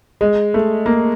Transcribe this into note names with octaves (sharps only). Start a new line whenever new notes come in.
G#3
A3
A#3